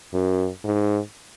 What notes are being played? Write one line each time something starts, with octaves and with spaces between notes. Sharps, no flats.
F#2
G#2